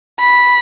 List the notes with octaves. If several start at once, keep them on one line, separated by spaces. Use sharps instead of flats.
B5